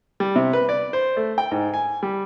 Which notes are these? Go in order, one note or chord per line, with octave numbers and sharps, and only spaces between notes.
G3
C3
B4
D5
C5
A3
G5
G#2
G#5
G3